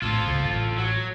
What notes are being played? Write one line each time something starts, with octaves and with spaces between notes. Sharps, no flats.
A#1 A2 F4 A4
G1 C#2
A1
F#3